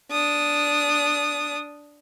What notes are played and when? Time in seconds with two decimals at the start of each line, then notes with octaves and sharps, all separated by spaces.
0.11 D4 D#6